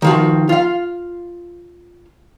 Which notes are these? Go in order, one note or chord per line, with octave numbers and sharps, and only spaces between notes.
D#3 F3 F#4
F4 F5